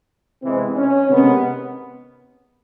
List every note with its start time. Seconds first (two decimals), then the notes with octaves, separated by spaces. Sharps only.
0.42 C3 E3 G#3 B3 C4
0.76 C#4
1.09 C3 D#3 G#3 B3